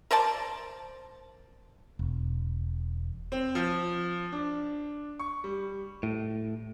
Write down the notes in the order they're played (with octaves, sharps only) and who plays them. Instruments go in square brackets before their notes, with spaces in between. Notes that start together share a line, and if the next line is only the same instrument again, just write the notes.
[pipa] A#4 C5 D5 A5
[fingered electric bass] E1
[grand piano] C4
F3
D4
C#6
G3
[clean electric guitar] A2